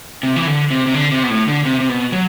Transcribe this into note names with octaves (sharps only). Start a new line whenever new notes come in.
C3
E3
D3
C3
C3
D3
C3
B2
A2
D3
C3
C3
B2
F#3